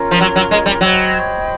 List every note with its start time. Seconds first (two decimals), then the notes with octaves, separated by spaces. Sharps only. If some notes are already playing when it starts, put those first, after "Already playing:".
Already playing: C#4 F4 A#4 C#5
0.11 F3
0.20 F#3
0.36 F#3
0.51 G#3
0.66 G3
0.81 F#3 C5 D#5 G5 B5